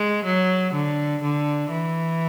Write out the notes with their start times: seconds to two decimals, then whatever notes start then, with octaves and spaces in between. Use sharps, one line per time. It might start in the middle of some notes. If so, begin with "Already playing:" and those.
Already playing: G#3
0.24 F#3
0.74 D3
1.23 D3
1.72 E3